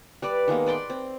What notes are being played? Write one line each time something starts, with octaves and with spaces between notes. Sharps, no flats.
G3 B4 D5
D#3 G#3 A#3 B3
B4 D5 G5 C6
C4